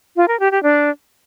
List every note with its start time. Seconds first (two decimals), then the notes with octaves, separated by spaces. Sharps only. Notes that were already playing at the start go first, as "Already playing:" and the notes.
0.16 F4
0.28 A#4
0.40 G4
0.51 G4
0.63 D4